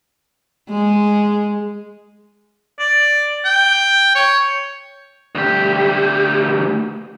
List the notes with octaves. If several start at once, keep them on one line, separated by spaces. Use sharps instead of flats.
G#3
D5
G5
C#5
D2 G4